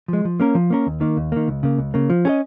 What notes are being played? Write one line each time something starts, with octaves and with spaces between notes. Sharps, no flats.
F3 G#3
F3
A#3 C#4 A#4
F3
A#3 C#4 A#4
D#2
D#3 A#3
D#2
D#3 A#3
C#2
C#3 A#3
C#2
C#3 A#3
F3
C#4 G#4 D#5